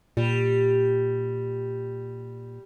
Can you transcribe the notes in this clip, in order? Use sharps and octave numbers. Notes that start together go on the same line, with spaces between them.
A#2 G3